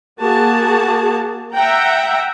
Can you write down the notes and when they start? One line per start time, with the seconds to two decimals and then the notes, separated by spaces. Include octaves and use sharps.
0.20 A#3 F#4 G#4 A5
1.54 E5 F#5 G5 A#5